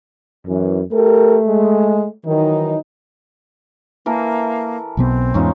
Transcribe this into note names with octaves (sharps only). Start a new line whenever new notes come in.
F#2 E3
A3 G4 A4 A#4
G#3
D#3 E3 F#3 D#4
E3 A#3 A4 A#4
B1 B2 B3 C4
E2 G#2 C#4 D#4 F4